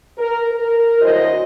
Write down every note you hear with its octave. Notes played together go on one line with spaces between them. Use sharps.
A#4
A#4
D2 F#3 E4 F#4 C5 D#5